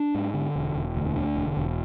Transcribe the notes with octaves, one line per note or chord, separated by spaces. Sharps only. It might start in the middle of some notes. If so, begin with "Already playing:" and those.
Already playing: D4
G#2
D3
E1
E1
D2
D3
E1
E1